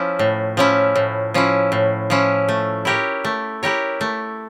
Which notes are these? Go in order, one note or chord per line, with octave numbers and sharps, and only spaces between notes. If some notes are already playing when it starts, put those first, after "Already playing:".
Already playing: F3 C#4 E4
A2
F3 C#4 E4
A2
F3 C#4 E4
A2
F3 C#4 E4
A3
E4 G4 A#4 C#5
A3
E4 G4 A#4 C#5
A3